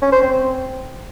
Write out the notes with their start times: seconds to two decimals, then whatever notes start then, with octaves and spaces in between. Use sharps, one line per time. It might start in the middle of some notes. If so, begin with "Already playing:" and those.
0.02 C#4
0.12 C5
0.22 C4